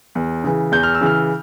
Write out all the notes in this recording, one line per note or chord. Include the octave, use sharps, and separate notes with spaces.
E2
C#3 E3
E2 G6
F6
E6
C#3 E3 F6